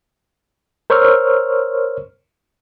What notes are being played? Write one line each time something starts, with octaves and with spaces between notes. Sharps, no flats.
A#4 C5 C#5 C#6 E6 F6